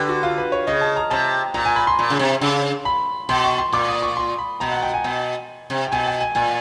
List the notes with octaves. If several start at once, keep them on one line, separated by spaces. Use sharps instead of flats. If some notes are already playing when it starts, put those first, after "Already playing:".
Already playing: D3 G4 B4
F#4
F4
B4
C#5
C#3 D#5
A5
A#5
C3 A5
A#2 A#5
G#5
B5
C6
A#2
C#3
C3
C#3
B5
B2 C6
C#6
C6
A#2 D6
D#6
C#6
C6
B5
B2 A#5
F#5
G5
G#5
B2
C3
G5
B2 G#5
G5
G#5
A#2 G#5